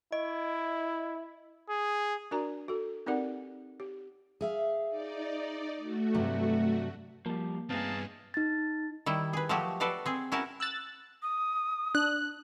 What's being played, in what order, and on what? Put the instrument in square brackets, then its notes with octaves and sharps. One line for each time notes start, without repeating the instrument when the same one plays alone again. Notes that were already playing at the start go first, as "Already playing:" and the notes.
[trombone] E4 [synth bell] D#5
[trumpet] G#4
[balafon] D4 F#4 A#4 D5 A#5
F#4 A4
C4 D#4 G4 A#4 D5 F#5
G4
[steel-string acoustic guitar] G#4 E5 F5
[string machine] D#4 D5
A3 F#4
[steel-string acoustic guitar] G2 C3 F#3
[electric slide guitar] F3 G3 [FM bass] A#3
[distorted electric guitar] G2 C4 [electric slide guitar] B3 G#4 [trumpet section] D#4 F5 A5
[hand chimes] D#4 A6
[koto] D#3 G3 E4
G#4 B4
F3 F#3 A3 F#4 G4
F#4 A4 B4 D5 D#5 F5
C4 G#4
C#4 E4 F#4 A#4 A5
[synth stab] E6 F#6 A6
[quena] D#6
[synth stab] D4 [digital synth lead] F#6